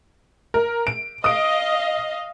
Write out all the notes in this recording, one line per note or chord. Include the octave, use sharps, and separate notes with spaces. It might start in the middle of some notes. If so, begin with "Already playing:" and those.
A#4
D7
D#5 F5 D#6 D7